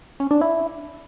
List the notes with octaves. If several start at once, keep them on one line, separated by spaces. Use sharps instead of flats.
C#4
D4
E4